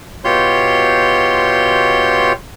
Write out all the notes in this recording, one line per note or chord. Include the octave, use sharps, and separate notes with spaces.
B2 F4 G4 C#5 C6 G6